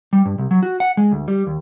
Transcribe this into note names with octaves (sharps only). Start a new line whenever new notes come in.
G3
G2
C2
F#3
F#4
F#5
G#3
D2
G3
D#2